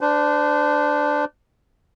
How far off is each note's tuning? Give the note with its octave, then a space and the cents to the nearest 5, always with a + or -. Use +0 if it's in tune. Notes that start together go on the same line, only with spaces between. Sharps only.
D4 +0 C5 -35